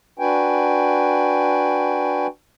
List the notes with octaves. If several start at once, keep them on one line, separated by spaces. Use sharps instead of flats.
D4 F#4 B4 G5 G#5